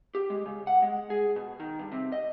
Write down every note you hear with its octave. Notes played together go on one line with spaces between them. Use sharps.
G4
G#3
C#3
F#5
G#3
G#4
B2
D#3
G2
C3
D#5